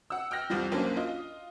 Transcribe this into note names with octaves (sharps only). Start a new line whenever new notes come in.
F#5 E6
G5 F6 F#6 A#6
C2 F2 F3 G3
B1 A#3 C#4 D4 C5
F4 D#5